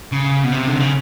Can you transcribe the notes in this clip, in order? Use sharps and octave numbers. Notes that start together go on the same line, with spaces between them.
C#3
B2
C3
D3
C#3